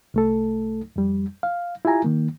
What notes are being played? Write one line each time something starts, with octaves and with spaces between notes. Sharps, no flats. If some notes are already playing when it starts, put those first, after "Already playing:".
C2 A3 A4
F2 G3
F5
E4 F4 G4 G#5 A#5
D#3 A#3